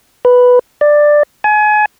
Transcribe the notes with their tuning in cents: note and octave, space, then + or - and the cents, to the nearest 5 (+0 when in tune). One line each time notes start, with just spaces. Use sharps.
B4 +0
D5 +10
G#5 +30